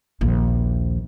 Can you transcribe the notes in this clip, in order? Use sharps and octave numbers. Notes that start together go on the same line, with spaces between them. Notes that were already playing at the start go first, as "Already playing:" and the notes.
A#1 D#2